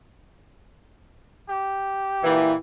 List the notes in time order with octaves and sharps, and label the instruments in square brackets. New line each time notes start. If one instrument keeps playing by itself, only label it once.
[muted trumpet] G4
[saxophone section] A#2 E3